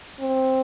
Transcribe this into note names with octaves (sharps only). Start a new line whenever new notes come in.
C4